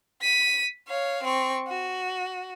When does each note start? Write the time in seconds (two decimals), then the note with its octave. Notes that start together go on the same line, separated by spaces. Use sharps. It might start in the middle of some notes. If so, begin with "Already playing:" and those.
0.22 B6 D#7
0.88 C#5 F5
1.24 C4 C#6
1.68 F#4